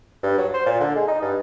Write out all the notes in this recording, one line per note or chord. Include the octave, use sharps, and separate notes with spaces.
G2
F#3
C5
A#2
D3
G#3
D#4
G2